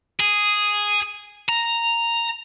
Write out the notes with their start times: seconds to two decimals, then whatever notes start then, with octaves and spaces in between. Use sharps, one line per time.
0.20 G#4
1.49 A#5